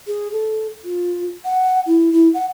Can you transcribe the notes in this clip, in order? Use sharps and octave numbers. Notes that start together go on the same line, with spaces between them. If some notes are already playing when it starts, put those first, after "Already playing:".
G#4
A4
F4
F#5
E4
E4
F#5